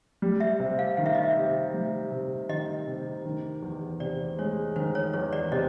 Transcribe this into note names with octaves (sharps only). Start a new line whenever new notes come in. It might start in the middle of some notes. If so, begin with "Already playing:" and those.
G3
E5
C3
F5
D#3 F5
E5
D#5
E5
C3
G3
C3
D#3 D#5
C3
D#3
E2
C3 D5
G#3 C#5
D#3 C5
C#5
E2 C#5
D5
C3 D#5